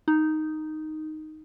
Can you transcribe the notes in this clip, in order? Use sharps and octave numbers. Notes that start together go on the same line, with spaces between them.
D#4